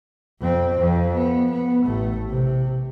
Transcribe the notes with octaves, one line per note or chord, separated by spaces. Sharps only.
F2 C4
F2
B3
B3
A1 A3
C3